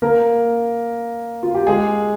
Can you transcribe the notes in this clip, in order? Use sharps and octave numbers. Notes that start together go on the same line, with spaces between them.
A#3 A#4
F4
G4
G#3 G#4